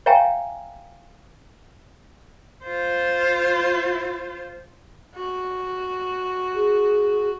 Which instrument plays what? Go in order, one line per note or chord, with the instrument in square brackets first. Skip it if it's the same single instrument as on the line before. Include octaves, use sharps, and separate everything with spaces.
[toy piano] C#5 E5 F5 G5 G#5 A#5
[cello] F4 C5
[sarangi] F#4
[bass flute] G#4